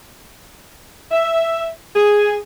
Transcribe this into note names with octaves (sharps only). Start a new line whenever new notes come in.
E5
G#4